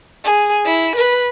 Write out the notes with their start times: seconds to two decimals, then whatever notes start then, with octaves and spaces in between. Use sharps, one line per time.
0.24 G#4
0.66 E4
0.96 B4